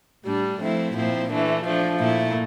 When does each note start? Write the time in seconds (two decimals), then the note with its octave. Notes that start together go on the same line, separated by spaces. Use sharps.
0.24 A2 G3 D4
0.60 F3 A3 C4 E4
0.95 A#2 F3 C4 E4
1.29 E3 A3 D4
1.65 F3 A3 D4
1.99 A#2 A3 E4